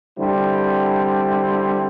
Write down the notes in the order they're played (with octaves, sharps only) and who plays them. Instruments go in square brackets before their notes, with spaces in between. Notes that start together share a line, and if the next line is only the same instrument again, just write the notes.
[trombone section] D3 G3 C4 E4